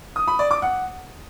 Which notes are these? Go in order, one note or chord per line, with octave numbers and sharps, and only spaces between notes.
D#6
B5
D5
D6
F#5